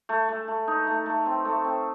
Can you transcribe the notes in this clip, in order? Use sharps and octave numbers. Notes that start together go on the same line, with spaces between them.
A3
A3
A3
D#4
A3
A3
C4
A3
C4